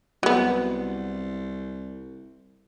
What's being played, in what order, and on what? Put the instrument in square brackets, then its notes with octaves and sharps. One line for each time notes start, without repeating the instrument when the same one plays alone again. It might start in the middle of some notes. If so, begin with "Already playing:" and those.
[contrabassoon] C2 [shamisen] F#3 B3